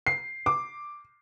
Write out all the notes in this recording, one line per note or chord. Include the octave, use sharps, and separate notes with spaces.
C7
D6